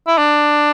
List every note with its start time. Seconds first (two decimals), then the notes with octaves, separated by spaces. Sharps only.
0.07 E4
0.18 D4